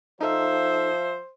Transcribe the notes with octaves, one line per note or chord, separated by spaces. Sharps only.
F3 D#4 A4 C5 E5 F5